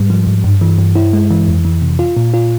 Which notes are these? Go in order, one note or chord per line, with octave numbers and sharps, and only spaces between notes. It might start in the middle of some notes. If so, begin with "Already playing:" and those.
Already playing: G#2 G3
F3
G#2
G2
E3
G2
E4
G#3
E3
F2
E3
C3
F4
A#2
F4